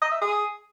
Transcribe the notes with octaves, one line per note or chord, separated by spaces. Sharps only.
D#5
E5
G#4